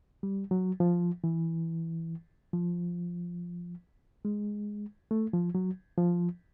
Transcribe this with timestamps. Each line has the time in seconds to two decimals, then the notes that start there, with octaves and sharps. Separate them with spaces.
0.23 G3
0.51 F#3
0.80 F3
1.24 E3
2.53 F3
4.25 G#3
5.11 A3
5.33 F3
5.55 F#3
5.98 F3